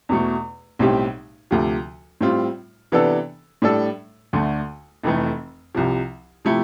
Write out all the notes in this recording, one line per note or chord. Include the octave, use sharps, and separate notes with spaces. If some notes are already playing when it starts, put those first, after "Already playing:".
E2 B2 A3
B1 A2 G3 C4 G4
D2 C3 F3
A2 G3 C4 F4
C3 E3 B3 D4 A4
A2 G3 D4 A4
D2 D3 A3
F1 F2 E3 A3
C2 C3 F3
C3 F3 A3 E4 G4